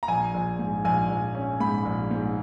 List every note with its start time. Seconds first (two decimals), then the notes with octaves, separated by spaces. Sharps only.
0.03 A#5
0.08 A#1 G#5
0.34 A#1
0.59 G#2
0.85 A#1 G#5
1.10 A#1
1.35 C#4
1.60 G#2 B5
1.85 A#1
2.11 G#2